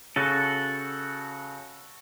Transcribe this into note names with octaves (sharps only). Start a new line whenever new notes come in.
C#3 F#4 A4 D#7